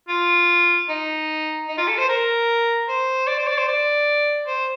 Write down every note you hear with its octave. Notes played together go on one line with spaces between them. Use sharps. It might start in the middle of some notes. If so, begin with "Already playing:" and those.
F4
D#4
D#4
F4
A4
C5
A#4
C5
D5
C5
D5
C5
D5
C5